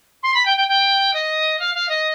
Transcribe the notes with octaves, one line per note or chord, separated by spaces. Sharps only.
C6
B5
G5
G5
G5
D#5
F5
F5
D#5